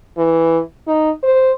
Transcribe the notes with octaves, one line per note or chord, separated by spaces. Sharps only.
E3
D#4
C5